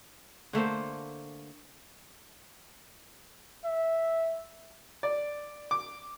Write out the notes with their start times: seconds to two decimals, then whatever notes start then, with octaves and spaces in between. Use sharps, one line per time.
0.53 D3 A3 A#3 C5
3.65 E5
5.03 D5
5.71 D6